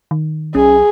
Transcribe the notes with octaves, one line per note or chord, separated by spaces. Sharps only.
D#3
B1 C#4 G#4